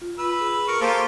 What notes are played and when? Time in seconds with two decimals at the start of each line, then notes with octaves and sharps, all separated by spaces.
0.01 F4
0.18 B4 E6
0.41 G#4
0.68 A#4 C#6
0.81 A#3 F4 G4 A4 C5